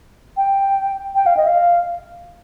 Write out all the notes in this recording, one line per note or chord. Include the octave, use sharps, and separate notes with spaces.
G5
G5
F5
D#5
F5